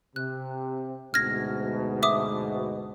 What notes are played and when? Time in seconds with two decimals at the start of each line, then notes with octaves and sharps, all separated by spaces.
0.16 C3 F#6
1.14 D2 G#2 B2 F6 G#6 A#6
2.03 E5 D6 D#6